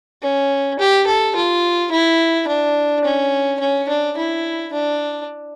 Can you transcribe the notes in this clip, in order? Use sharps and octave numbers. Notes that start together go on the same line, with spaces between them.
C#4
G4
A4
F4
E4
D4
C#4
C#4
D4
E4
D4